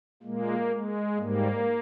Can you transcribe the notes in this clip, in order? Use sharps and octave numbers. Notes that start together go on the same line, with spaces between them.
A#2 G#3 A#3
G#3
G#2 G3 A#3